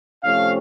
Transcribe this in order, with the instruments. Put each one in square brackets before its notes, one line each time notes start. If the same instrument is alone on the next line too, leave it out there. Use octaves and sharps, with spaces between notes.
[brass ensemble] C3 F3 A3 C#4 F5